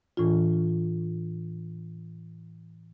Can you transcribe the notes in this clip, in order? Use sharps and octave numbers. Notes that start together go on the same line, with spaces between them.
A2 E3 D4 F4